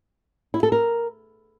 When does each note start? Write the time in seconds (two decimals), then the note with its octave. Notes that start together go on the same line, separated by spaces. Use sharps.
0.54 E4
0.63 A4
0.72 A#4